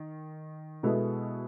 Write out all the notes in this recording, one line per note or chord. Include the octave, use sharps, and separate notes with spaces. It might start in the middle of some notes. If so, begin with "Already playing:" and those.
Already playing: D#3
B2 G#3 B3 E4 A4